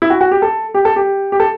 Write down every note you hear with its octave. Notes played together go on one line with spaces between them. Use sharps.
E4
F#4
F#4
G4
A4
G4
A4
G4
G4
A4